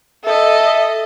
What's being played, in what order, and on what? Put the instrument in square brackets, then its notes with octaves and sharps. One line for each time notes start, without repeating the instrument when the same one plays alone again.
[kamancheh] A4 D#5 [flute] E5